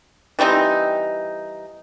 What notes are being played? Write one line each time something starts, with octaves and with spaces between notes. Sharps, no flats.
E3 G3 C4 D#4